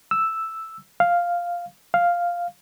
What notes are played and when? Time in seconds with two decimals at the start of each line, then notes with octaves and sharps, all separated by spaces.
0.11 E6
1.00 F5
1.94 F5